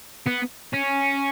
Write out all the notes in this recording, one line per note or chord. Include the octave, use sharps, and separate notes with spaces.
B3
C#4